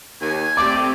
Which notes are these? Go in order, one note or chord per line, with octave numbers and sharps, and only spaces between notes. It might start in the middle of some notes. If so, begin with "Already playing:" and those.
D#2 G#5
A3 C4 G4 D5 D6